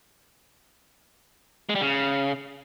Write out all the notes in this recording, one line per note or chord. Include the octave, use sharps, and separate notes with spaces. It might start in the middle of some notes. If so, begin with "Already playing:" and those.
G#3
G3
C#3